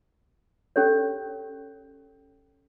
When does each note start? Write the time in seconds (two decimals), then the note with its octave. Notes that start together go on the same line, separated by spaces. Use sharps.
0.76 C#4 G4 A4 C#5